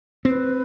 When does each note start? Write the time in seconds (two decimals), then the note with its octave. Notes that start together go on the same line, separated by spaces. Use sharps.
0.25 C4 C5
0.30 B4